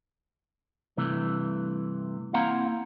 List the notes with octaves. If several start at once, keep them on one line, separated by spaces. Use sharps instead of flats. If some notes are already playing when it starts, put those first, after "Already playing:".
G2 C3 E3 A3
A#3 C4 E4 F5 F#5 A#5